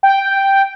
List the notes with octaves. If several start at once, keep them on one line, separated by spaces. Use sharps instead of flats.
G5